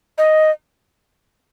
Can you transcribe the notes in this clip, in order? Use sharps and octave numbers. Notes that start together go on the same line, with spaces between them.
D#5